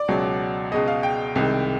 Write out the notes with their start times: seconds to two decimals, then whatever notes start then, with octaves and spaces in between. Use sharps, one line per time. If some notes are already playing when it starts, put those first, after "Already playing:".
Already playing: D5
0.08 C#2 B2 F#3
0.72 C#2 B2 G#3 D#5
0.88 F5
1.03 G5
1.35 C2 C3 D#3 G#3